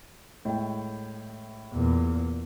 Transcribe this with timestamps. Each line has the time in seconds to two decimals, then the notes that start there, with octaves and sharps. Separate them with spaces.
0.45 A2 G#3 G5
1.73 E2 A#2